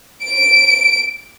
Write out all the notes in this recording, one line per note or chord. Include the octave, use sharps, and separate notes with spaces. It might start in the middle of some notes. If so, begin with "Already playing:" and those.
D7